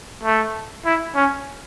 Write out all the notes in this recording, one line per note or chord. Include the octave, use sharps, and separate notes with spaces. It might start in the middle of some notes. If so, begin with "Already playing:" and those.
A3
E4
C#4